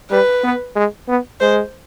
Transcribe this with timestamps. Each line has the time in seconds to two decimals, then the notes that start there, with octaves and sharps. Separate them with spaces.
0.11 G3 B4
0.44 B3
0.76 G#3
1.08 B3
1.41 G#3 C5